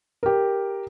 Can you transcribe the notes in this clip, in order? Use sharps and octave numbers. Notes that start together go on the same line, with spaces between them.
G4 A#4